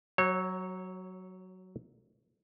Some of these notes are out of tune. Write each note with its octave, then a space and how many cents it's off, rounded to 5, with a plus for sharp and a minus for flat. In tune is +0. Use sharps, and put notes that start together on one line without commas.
F#3 +5 C#5 -25